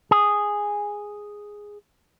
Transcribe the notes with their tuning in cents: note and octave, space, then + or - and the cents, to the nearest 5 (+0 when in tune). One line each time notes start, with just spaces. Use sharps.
G#4 -5